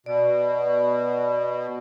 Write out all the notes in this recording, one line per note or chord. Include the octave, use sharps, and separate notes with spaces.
B2 D5